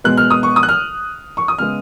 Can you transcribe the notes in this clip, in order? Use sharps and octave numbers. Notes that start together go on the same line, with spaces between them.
B2 G#3 B3 F#6
F6
D#6
C#6
D#6
F#6
F6
C#6
D#6
C#3 G#3 B3 F6